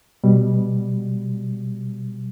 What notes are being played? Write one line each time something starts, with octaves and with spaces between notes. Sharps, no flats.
B2 G3